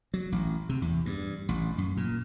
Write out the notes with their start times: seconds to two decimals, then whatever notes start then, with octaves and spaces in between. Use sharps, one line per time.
0.14 F#3
0.32 A1
0.69 C3
0.82 E2
1.06 G2
1.49 A1
1.78 F#2
1.97 A#2